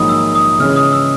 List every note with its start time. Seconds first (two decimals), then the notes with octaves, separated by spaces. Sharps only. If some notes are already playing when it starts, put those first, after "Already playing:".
Already playing: A#1 G#2 D#3 F#3 A#3 B5 D#6
0.09 E6
0.35 D#6
0.59 C#3 E3 G#3 C#4 F6
0.76 D#6
0.93 E6